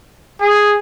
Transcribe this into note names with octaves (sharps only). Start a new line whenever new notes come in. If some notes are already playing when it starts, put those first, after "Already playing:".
G#4